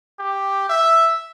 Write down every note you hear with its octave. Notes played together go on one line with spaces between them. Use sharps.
G4
E5